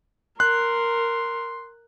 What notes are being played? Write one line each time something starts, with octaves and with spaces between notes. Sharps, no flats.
A#4 C6 F#6